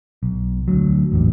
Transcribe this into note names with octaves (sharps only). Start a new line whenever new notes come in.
B1
D2 F#3
A1 E2 G2